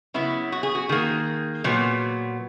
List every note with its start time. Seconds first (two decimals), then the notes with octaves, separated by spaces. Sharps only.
0.14 C#3 F#3 B3 E4
0.52 F#4
0.63 G#4
0.75 F#4
0.89 D#3 A#3 G#4
1.64 A#2 F#3 B3